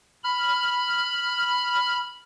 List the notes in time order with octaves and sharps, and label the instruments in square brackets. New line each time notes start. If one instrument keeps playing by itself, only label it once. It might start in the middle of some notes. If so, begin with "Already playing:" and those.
[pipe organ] B5 F6